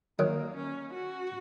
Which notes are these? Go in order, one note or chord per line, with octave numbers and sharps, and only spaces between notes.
D#3 F#3 A#3
C#4
F#4